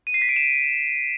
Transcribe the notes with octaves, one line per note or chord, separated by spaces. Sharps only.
D#7
C7
B6
D7
E7